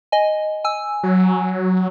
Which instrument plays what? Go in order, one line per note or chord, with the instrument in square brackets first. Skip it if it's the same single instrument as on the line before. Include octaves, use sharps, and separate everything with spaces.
[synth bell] D#5 G#5
G#5 E6
[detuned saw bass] F#3